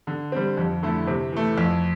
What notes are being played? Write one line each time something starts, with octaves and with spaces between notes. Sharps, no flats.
D3
G3 C4
F2
D3 A3 E4
C3
E3 A3
F2